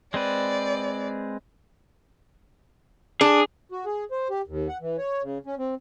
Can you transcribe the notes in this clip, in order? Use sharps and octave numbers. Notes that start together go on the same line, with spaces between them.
G#3 C4 B4 D5
D4 G#4
F#4
G#4
C5
G4
D#2
F#5
E3
C#5
C#3
C#4
C4